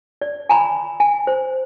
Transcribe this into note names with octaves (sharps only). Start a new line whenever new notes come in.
D5
G#5 A#5 B5
G#5
C5